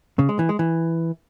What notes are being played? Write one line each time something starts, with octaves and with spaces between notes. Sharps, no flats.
C#3
G#3
E3
G#3
E3